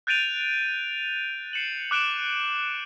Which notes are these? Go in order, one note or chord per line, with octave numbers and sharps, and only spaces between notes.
F#6 G6 A6 D7 D#7 F7
C7 C#7 E7 F#7
D6 F#6 D7 E7 F#7